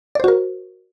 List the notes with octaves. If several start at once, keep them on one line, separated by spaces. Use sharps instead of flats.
F#4 A#4 C5 D5